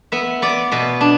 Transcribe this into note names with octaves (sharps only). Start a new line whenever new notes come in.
B3 E5
B3 D5
B2 B4
D4